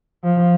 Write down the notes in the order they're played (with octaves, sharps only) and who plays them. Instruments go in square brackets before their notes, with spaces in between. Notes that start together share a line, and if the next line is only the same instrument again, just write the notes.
[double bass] F3